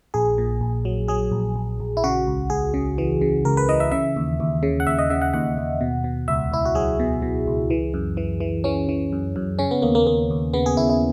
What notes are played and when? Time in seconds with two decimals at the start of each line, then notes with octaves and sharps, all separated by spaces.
0.14 A#1 G#4
0.38 A#2
0.61 A#1
0.85 F#3
1.08 F#3 G#4
1.32 A#1
1.56 A#1
1.80 A#1
1.97 E4
2.04 C#3 F#4
2.27 C#2
2.50 C#2 G#4
2.74 C#3
2.98 E3
3.21 C#3
3.45 C#2 A#4
3.57 B4
3.69 E3 D#5
3.80 E5
3.92 C#3 E5
4.16 D#2
4.40 D#2
4.63 C#3
4.80 F#5
4.87 D#2 E5
4.98 D#5
5.10 C#3 E5
5.21 F#5
5.34 D#2 F#5
5.58 D#2
5.81 B2
6.04 B2
6.28 C#2 E5
6.52 C#2 E4
6.65 F#4
6.75 F#3 G#4
7.00 B2
7.22 B2
7.47 C#2
7.70 E3
7.94 F#2
8.17 E3
8.40 E3
8.64 E3 C#4
8.89 E3
9.12 F#2
9.36 F#2
9.59 C#3 C#4
9.71 B3
9.82 D#2 A#3
9.95 A#3
10.06 D#2 A#3
10.30 D#2
10.54 C#3 B3
10.66 G#4
10.77 D#2 E4
10.90 E4